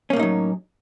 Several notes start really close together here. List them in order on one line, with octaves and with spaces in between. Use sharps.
C#4 A#3 A2 D#4 F#3